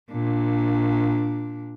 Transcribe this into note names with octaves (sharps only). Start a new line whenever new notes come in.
A#2 D4